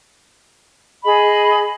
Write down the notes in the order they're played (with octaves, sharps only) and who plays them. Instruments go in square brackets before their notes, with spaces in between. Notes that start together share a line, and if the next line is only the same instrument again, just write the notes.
[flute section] G#4 D#5 B5